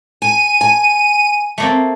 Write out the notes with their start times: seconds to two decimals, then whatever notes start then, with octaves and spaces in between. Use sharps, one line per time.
0.22 G#5 D#7
0.61 G#5
1.58 A3 A#3 C4